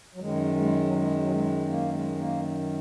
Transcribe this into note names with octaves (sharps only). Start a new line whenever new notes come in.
F#3
F#2 D#3 G#3
G#3
F#3
G#3
F#3
G#3
A#3
G#3
A#3